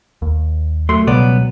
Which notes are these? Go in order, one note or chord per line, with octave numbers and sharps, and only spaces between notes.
D#2
F#2 A3 C6
C#2 B2 F#3 G3 B3 D5